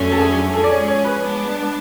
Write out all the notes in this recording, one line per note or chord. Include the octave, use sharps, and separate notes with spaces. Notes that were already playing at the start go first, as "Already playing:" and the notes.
Already playing: F2 D3 F#3 A3 C#4
A4
G#4
F3 G#3 C#4 G#4 A4
D5
C#5
C#5
B4
G#3 B3 D4